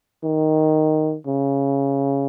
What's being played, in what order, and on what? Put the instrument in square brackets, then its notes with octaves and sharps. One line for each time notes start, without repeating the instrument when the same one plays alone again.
[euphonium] D#3
C#3